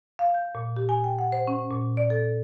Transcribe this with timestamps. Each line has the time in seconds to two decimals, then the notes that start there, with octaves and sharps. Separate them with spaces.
0.19 F5
0.34 G6
0.55 A#2
0.76 G4
0.89 G#5
1.04 G5
1.19 F#5
1.32 C5
1.47 C#4
1.70 A#2
1.97 D5
2.10 A4